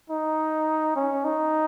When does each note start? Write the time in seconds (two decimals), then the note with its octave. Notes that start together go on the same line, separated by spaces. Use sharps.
0.10 D#4
0.96 C#4
1.24 D#4